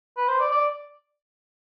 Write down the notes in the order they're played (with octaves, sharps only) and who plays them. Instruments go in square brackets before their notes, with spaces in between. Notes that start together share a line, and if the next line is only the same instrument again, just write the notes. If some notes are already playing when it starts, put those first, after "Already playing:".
[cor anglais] B4
C5
D5
D5